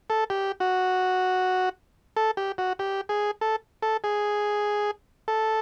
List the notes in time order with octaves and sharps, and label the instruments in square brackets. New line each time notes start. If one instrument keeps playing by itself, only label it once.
[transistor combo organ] A4
G4
F#4
A4
G4
F#4
G4
G#4
A4
A4
G#4
A4